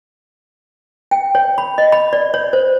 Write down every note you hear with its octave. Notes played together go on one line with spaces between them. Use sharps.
G5
C#5
B5
D#5
B5
D5
C#5
C5